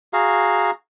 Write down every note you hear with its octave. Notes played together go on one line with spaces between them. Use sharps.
F#4 G#4 F5 A#5